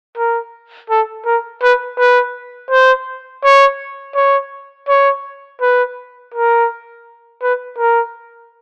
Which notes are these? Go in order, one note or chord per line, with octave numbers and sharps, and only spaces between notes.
A#4
A4
A#4
B4
B4
C5
C#5
C#5
C#5
B4
A#4
B4
A#4